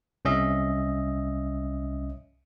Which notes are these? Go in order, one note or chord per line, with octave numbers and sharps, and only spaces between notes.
C2 C#4 D#5 E5